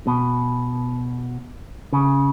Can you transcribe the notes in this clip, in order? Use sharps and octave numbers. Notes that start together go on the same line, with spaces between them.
B2
C#3